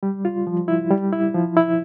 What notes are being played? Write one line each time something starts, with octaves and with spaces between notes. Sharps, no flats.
G3
F4
F3
E4
G3
E4
F3
E4